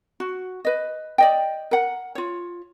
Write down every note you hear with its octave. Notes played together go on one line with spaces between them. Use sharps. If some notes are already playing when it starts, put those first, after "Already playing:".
F#4
B4 D#5
D5 D#5 G5
A#4 F#5
F4 C#5